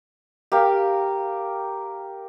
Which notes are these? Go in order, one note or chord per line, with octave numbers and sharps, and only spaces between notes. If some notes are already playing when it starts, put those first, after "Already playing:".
G4 A#4 F5